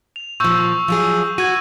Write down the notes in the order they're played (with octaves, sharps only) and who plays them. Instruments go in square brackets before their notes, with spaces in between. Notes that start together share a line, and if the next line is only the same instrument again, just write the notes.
[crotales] F7
[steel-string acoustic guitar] A#2 F3 [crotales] C#6 E6 G6
[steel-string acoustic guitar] F3 F#3 G#4
[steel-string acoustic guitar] F#4 [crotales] G#6 D#7